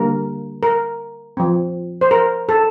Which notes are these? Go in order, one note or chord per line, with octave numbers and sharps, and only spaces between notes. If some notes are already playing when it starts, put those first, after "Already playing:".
Already playing: D3 G3 A#3 A#4
A#4
F3 C4
C5
A#4
A4